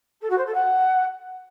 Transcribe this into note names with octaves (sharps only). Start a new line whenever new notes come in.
A4
F#4
C5
A4
F#5